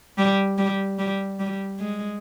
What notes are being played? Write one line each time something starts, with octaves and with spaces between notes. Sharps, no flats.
G3
G3
G3
G3
G#3